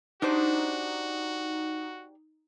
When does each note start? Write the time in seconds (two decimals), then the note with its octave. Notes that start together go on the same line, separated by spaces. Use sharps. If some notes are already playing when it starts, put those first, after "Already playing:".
0.22 D4 D#4 F#4 G4 C5